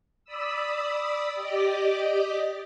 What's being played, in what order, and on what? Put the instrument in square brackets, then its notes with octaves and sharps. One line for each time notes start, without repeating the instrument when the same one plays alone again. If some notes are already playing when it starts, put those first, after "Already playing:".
[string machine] D5 B5 D#6 E6
G4 D5 D#5 D6